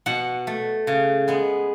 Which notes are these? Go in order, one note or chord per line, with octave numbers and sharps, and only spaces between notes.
B2 F#5
A3
C#3
G#3 B3